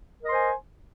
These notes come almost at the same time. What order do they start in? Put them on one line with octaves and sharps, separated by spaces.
A#4 D#5 C6 C5 G#5